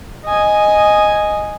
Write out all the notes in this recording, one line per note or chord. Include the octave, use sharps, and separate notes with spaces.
D#5 G#5